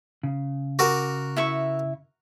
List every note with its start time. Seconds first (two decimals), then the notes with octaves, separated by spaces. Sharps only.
0.23 C#3
0.79 F#4 A#4 D6
1.36 E4 E5 C#6